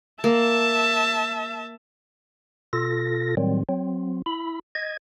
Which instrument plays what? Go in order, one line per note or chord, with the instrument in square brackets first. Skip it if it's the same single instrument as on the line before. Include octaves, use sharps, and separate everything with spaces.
[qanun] A#3 [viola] E5 A5
[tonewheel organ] B2 F4 A4 A#6
A2 D#3 F#3 G3 C4
F#3 C4
E4 B5
D#5 G#6